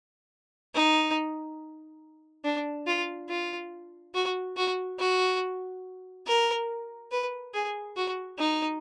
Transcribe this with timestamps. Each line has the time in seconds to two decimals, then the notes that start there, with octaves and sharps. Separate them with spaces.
0.74 D#4
2.44 D4
2.87 F4
3.29 F4
4.14 F#4
4.57 F#4
4.99 F#4
6.26 A#4
7.11 B4
7.54 G#4
7.96 F#4
8.38 D#4